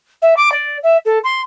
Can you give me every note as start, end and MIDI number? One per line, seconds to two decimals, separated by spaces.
0.22 0.34 76
0.36 0.52 86
0.52 0.77 74
0.83 0.97 76
1.05 1.19 69
1.24 1.41 84